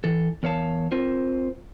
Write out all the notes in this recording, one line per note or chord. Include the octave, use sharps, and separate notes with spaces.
E3 A4
E2 A#4 C#5 F5 A5
C4 F4 A#4 C5